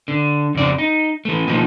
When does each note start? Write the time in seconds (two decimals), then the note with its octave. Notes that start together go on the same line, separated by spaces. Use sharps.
0.08 D3
0.55 F2 C#3 D5
0.78 D#4
1.25 E3 A3
1.48 B2 F3 A#3 D#4